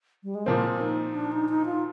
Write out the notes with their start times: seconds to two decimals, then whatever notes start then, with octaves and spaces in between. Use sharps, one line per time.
0.24 G3
0.35 G#3
0.46 A#2 F3 A#3 C4
0.81 D#4
1.15 D4
1.32 D#4
1.49 D#4
1.66 F4